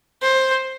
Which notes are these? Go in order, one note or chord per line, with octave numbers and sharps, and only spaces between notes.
C5